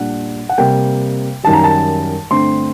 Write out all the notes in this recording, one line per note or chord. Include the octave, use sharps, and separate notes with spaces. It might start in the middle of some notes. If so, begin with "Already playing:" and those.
Already playing: A#2 G3 D4 F#5
F#5
C3 G3 A#3 G5
F#2 D#3 G3 A5
A#5
A5
G2 D3 A3 C4 C6